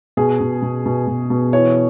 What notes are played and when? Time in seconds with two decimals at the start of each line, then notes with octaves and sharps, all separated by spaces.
0.17 B2 G#4
0.40 B2
0.62 B2
0.86 B2
1.07 B2
1.30 B2
1.53 E3 C#5